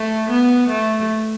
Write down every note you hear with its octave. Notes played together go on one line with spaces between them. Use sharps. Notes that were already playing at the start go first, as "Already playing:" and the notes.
Already playing: A3
B3
A3